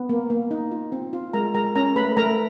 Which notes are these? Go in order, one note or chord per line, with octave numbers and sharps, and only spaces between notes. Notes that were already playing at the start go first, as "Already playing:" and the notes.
Already playing: B3
A#3
A#3
D#4
F4
C4
F4
G#3 A#4 A#5
G#3 A#4 A#5
C#4 A#4 A#5
A3 B4 B5
A3 A#4 A#5